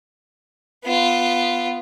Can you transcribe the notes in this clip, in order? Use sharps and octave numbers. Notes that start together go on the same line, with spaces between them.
B3 F4